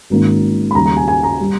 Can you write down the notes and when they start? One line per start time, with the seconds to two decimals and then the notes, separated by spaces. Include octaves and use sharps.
0.10 G#1 G#2 D#3 A#3 C#4
0.71 B5
0.75 D#2 C#3 G3 A#5
0.86 A#5
0.97 G#5
1.08 G#5
1.23 A#5
1.40 G3